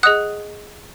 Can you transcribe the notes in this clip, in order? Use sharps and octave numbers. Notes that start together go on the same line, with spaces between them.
G#4 D#5 F#5 D#6 F#6